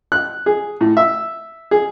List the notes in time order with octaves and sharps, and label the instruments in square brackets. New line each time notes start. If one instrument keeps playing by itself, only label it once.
[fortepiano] F#6
G#4
A2
E5
G#4